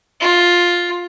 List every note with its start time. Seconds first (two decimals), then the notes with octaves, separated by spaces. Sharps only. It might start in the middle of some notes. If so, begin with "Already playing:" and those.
0.21 F4